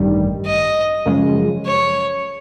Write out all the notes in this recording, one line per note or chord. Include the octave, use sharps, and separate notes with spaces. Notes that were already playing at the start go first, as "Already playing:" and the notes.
Already playing: A1 G2 D#3 G3
D#5
F#2 C#3 F3 G#3
C#5